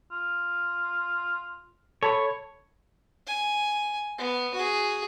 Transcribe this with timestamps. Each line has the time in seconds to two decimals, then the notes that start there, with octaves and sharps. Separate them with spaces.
0.12 F4
2.03 A4 C#5 A5 B5
3.27 G#5
4.18 B3
4.54 F#4 G#4